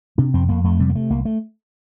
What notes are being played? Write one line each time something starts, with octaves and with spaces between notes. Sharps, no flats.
C3 D4
F2 C4
F2 A#3
F2 A3
C3 G3
A#3
C3 A3
C2 A#3
A3